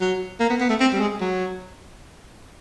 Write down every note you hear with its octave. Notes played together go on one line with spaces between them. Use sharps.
F#3
A#3
B3
B3
A3
C4
G3
G#3
F#3